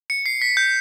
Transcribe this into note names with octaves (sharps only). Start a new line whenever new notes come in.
C#7
C7
B6
G6